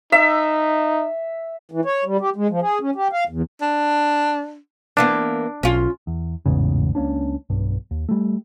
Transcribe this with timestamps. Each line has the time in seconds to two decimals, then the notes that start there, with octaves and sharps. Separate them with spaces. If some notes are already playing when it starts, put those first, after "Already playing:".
0.12 D#4 E5
1.72 E3
1.85 C#5
2.05 G3
2.20 G4
2.36 G#3
2.50 F3
2.62 G#4
2.81 C#4
2.95 G4
3.13 F5
3.29 E2
3.61 D4
4.97 E3 A#3 B3 D4
5.63 B1 C#4 F4
6.07 E2
6.46 A1 E2 G#2 C#3
6.95 C#2 A#3 C#4 D4
7.50 B1 G2
7.91 D#2
8.09 G3 A3